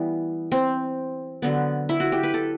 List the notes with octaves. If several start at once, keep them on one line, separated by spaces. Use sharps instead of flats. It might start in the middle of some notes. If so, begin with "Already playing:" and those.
Already playing: E3 G3 B3
C4
D3 F#3 B3
E4
F#4
G4
B4
A4